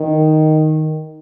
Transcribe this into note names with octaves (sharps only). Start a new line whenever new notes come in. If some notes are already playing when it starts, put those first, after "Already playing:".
Already playing: D#3